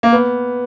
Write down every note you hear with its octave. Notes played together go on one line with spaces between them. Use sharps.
A#3
B3